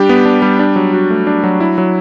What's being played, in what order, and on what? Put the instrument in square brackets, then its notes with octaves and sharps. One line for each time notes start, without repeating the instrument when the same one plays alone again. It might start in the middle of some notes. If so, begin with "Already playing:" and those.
Already playing: [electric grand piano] G3 D4 G4
B3
D4
G3
D4
F#3
F#4
A3
D4
F#3
E4
F#3